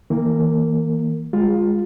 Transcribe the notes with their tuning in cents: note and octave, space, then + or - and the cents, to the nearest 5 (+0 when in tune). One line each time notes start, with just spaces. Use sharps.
E3 -40 A#3 +0 A#4 -30
G#3 -20 F4 +15